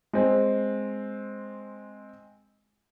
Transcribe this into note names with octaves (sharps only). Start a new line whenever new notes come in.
G#3 C4